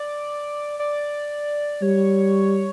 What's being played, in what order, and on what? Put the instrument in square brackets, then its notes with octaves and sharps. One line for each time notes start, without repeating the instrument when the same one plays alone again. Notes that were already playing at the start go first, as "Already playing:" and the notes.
Already playing: [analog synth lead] D5
D5
[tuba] G3 [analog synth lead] C#5